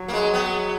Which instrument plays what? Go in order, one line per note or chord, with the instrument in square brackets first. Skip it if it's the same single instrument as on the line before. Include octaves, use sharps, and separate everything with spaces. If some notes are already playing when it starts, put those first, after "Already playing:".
Already playing: [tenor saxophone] F#3
[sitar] A#3
G#3
B3